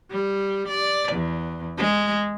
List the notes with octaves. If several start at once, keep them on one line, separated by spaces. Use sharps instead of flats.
G3
D5
E2
G#3